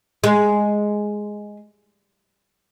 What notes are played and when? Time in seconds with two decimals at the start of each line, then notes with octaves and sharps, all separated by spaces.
0.24 G#3